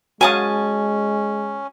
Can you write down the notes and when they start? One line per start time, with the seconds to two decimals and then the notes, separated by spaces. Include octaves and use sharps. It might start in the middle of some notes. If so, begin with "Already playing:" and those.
0.21 G#3 C#4 F#4 C#5 F5 G#5 A5 D#6